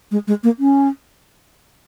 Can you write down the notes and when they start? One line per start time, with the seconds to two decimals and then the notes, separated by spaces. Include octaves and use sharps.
0.11 G#3
0.27 G#3
0.43 A#3
0.59 C#4